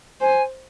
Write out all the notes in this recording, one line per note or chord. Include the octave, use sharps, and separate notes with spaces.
C5 G#5